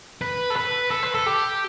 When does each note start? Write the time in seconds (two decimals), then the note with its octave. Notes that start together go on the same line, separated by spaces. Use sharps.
0.21 B4
0.50 A4
0.56 B4
0.91 A4
1.03 B4
1.14 A4
1.26 G4